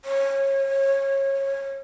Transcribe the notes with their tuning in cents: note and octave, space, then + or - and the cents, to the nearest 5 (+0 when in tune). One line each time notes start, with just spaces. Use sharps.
C#5 -25